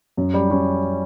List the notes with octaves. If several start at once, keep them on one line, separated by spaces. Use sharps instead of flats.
F#2
G3
C#4